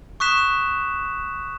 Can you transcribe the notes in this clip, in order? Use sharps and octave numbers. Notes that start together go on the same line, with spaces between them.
C#6 D#6 F#6 B6 E7